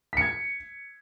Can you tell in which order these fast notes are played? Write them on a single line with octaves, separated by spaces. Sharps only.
B6 C#7 G#6